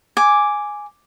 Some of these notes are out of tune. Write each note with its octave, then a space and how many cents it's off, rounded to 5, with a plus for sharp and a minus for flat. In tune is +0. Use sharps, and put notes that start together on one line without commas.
G#5 +0 D6 +0